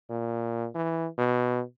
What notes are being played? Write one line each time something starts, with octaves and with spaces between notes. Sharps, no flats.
A#2
E3
B2